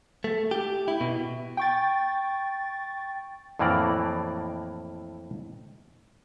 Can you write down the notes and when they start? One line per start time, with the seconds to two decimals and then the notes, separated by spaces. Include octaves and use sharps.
0.24 A3
0.51 G4
0.88 E4
1.01 B2
1.57 G5 C#6 A6
3.59 F2 A2 E3 A#3 D5 A#5